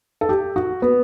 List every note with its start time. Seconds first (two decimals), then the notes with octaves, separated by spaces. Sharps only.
0.21 A4
0.29 G4
0.56 F#4
0.82 B3